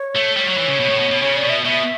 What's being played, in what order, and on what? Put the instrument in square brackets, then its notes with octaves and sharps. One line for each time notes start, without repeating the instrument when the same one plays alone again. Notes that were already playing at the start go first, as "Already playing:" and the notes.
Already playing: [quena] C#5
[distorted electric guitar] A3
[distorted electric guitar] G3 [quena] C#5
[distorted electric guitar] F#3
E3
C#3
B2
A2
B2
B2
[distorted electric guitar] C#3 [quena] C#5
[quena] D5
[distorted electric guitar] B2
[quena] E5
[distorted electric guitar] B2 [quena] E5